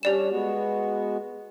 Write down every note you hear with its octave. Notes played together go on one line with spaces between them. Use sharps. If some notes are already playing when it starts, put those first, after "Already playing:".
G3 C#4 D4 G4 D5 E7
G#3 B3 F#4